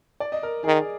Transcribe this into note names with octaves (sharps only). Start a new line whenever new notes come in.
D5
D#5
A#4
D#3 G#4